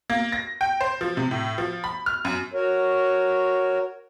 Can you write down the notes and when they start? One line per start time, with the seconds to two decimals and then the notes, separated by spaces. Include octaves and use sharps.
0.10 A#3
0.32 A#6
0.61 G5
0.81 C5
1.01 F3
1.17 C3
1.31 A2
1.58 F3
1.84 B5
2.06 F6
2.25 F#2
2.53 F#4 A#4 C#5